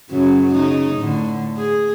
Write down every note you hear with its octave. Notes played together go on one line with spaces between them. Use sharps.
F#2 C#3 F#3
C#3 D#4
A2 D3
G#4